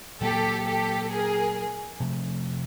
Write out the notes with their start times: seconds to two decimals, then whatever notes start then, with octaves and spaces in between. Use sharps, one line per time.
0.21 A#2 F#3 A#3 G4 A4
0.66 G4 A4
1.10 G#4 A#4
2.00 C3 F3 A3